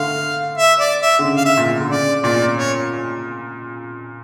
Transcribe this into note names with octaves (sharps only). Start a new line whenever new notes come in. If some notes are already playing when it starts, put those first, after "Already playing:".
Already playing: D3 A3 F5
E5
D5
E5
D3
C#3
F5
E5
A#2
D3
C#3 D5
A#2 D5
C#5